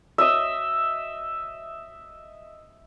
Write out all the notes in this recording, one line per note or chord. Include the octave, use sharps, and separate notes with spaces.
D#5 E5